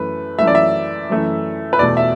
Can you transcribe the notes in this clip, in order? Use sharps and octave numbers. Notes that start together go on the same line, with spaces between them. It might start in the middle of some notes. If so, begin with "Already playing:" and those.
Already playing: F#2 E3 A3 B4
F#2 E3 A3 E5
D5
E5
F#2 E3 A3
B4
E2 B2 A3 D5
E5